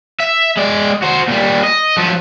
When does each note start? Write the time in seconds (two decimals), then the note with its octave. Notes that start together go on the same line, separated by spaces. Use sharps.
0.20 E5
0.57 G#3 D5
1.02 F#4 C5
1.28 A#2 G3
1.63 D#5
1.97 F3 F#3